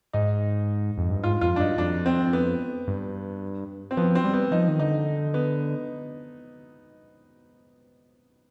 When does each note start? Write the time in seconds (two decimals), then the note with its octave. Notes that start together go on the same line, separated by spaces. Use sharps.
0.13 G#2 D#4
0.98 F2
1.10 G2
1.23 G#2 F4
1.41 F2 F4
1.56 D4
1.59 G2 D#4
1.78 F2 D4
2.06 C4
2.33 B3
2.87 G2
3.91 C4
3.97 F3 B3
4.15 C4
4.24 G3
4.34 B3
4.51 F3 D#4
4.68 D#3
4.79 D3 D#4
5.34 B3